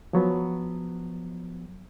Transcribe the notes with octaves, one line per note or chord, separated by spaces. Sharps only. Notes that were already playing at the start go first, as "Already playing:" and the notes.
F3 F#3 B3